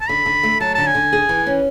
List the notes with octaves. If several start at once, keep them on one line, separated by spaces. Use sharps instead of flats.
A5
D3 B5
D3
A3
F#3 A5
D3 A5
G#5
D3
G#4
E3
C#4